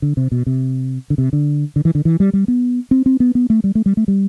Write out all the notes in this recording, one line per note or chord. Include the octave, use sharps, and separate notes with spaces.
D3
C3
B2
C3
D3
C3
D3
D3
E3
D3
E3
G3
G3
B3
C4
C4
B3
B3
A3
G3
A3
G3
A3
G3